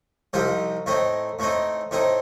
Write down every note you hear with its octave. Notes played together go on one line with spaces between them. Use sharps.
C2 C3 F3 C4 D#4
A2 A3 C4 D#4
A2 A3 C4 D#4
A2 A3 C4 D#4